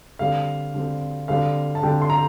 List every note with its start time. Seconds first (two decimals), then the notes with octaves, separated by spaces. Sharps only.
0.19 D3 G3 C4 F5
0.74 D3 G3 C4
1.28 D3 G3 C4 F5
1.75 A5
1.83 D3 G3 C4 G5
2.02 C6
2.10 A#5